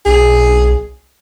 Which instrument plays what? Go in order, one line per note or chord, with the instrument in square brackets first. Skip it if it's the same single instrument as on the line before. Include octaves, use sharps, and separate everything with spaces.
[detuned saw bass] B1 [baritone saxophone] G#4